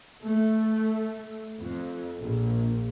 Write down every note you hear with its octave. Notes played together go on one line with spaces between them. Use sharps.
A3
F2
A#1